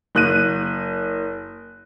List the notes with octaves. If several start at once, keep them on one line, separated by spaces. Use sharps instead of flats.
F#1 F#6 D#7